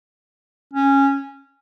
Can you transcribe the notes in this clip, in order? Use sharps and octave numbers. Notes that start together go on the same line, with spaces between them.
C#4